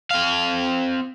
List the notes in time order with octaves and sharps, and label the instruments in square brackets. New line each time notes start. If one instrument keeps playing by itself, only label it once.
[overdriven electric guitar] C4 F5